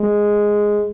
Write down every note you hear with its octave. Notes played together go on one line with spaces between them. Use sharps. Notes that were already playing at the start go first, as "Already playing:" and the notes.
Already playing: G#3